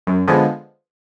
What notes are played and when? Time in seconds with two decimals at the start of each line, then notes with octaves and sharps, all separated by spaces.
0.07 F#2
0.27 D3 F3 G#3 B3